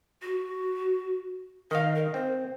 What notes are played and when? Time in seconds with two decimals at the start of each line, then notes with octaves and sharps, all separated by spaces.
0.22 F#4
1.71 D#3 D#5 F5
1.95 A#4
2.14 C4 C5